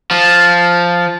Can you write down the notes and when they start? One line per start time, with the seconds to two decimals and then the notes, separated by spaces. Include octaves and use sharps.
0.11 F3